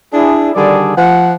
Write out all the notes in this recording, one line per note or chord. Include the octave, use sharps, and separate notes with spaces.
D4 E4 G#4
D3 D#3 G3 G#4 A4 D5
F3 F#5